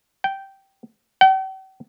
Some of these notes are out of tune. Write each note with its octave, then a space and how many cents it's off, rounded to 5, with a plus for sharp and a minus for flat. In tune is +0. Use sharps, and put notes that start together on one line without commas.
G5 -10
G5 -45